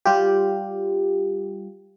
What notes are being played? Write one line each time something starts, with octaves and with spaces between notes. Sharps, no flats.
G3 F4 G4